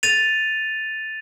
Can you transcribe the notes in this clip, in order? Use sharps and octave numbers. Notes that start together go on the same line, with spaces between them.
A6 D#7 F7